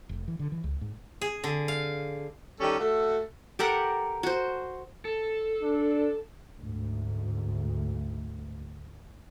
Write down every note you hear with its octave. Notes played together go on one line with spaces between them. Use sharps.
F1
E3
D3
E3
C#2
G#2
G#4
D3
F5
D#3 G3 C#4 G4 A4
A3 F#4 A4
G4 A4 A#4 F#5
F#4 C5
A4
D4
D2 G#2